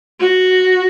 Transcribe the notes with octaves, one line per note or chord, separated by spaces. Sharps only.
F#4